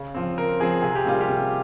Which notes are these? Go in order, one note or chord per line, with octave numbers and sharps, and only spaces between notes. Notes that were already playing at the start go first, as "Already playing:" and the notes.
Already playing: C#3
F3 C4
C#3 A#4
F3 C4 G#4
C3 G#4
G4
G3 A#3 F4
G4
C3